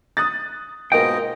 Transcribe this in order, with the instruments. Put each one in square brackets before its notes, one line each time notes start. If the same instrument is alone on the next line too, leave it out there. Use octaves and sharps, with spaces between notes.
[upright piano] D#6 F#6 A6
[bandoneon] G#2 B2 D#5 [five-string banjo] A#3 F4 A#4 [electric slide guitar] G5